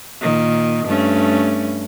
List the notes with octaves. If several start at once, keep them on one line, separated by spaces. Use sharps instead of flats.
A#2 D#3
G2 A3 C#4